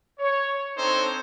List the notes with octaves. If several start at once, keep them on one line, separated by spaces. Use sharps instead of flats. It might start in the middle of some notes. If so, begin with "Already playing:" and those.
C#5
C4 D4 D#4 A4 C5 C#5